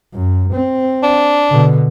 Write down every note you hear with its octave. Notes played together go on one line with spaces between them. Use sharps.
F#2
C4
D4
B2 D3